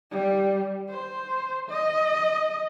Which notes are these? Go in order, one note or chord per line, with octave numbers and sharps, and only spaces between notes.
G3
C5
D#5